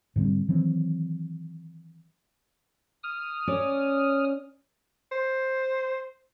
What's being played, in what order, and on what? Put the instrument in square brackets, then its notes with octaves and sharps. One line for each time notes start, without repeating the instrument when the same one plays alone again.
[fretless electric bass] G#2 D3 G3 C4
D#3 E3 F#3 C4
[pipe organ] D#6 F6
[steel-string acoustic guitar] C#4 C#5 D5
[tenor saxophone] C5